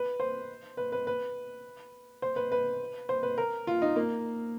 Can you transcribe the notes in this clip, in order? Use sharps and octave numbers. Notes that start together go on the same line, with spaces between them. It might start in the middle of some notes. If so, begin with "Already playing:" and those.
Already playing: B4
C5
B4
B4
B4
C5
B4
B4
C5
B4
A#4
F4
D#4
A#3